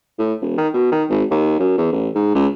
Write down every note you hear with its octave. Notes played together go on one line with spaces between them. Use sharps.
A2
E1
D#3
B2
D#3
G#1
D#2
F#2
E2
A1
G#2
C#2